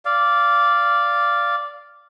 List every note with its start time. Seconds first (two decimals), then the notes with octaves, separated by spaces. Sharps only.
0.05 D5 F5